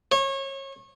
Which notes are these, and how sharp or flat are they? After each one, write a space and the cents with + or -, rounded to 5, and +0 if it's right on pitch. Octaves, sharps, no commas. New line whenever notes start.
C#5 -30